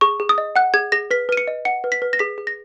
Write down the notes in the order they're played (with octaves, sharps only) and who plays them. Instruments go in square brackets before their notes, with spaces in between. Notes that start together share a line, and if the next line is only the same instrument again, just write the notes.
[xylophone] G#4 C#6
G#4
D#6
D#5
F#5 F#6
G#4 G#6
G#4 A#6
B4 B6
B4 D#7
C#7
D#5
F#5 C#7
B4
B6
B4
A#6
G#4 B6
G#4
A#6